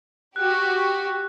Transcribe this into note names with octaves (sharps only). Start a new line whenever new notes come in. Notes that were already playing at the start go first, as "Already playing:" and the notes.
F#4 G4 F#6